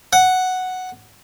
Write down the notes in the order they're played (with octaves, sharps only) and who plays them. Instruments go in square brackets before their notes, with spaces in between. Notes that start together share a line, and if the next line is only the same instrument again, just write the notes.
[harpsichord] F#5